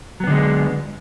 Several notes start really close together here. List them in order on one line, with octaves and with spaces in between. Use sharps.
F#3 B3 D3 G#3